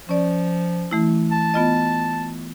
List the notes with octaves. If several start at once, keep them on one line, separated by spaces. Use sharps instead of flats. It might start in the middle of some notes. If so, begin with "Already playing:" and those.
F3 C#4 D5
E3 A3 E4
A5
B3 F4 D#5